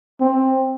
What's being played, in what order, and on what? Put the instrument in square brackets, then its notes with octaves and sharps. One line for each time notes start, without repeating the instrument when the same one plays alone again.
[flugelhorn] C4